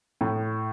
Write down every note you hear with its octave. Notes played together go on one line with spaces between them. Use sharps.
A2